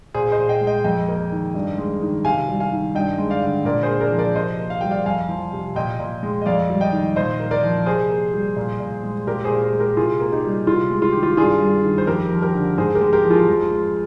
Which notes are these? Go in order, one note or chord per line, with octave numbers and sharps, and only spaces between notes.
A#2 G#4 C5
C5 D#5
A#2
D#5 G5
G#3
D#5 G5
F2 D#5 G5
A#3
D#3
G2
G#3
D#3
C3 F5 G#5
G3
F5 G#5
D#3
G2 D#5 G5
G#3
D5 F5
D3
A#2 A#4 D5
G#4 C5
A#3
A#4 D5
F3
A#4 D5
C3 C5 D#5
A#3
F5
G3 G5
D5 F5
F2 F5 G#5
F3
C3
A#2 D#5 G5
A#2
G#3
D#5
F2 D5 F5
G3
D#5 G5
D#3
A#2 C5 D#5
A#3
A#4 D5
F3
C3 G#4 C5
A#3
G3
A#2
A#2
G#3
A#2 G4 A#4
G#4 C5
A#2
G#4 C5
G#3
G4 A#4
C3 F4 G#4
A#3
D#4 G4
G3
C3 F4
G#3
F4
D#3 G4
F4
G2 F4 G#4
G3
D#3
C5
F2 G4 A#4
F3
G4 A#4
D3
G#2 G#4 C5
G4 A#4
G#3
G4 A#4
F3
F4 G#4
F2
G#3